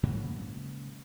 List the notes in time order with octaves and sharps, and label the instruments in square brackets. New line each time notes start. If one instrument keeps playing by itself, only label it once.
[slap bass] G#2 C#3 F#3 A#3